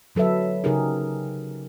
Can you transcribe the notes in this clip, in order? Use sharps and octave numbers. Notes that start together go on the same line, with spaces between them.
D3 F#3 A4 B4 E5
C#3 D#4 G4 G#4 A#4